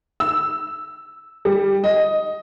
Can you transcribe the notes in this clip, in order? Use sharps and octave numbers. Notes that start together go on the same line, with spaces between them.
E6
G3
D#5